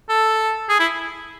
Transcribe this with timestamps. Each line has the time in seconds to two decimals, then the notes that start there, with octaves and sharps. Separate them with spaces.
0.09 A4
0.69 G#4
0.80 E4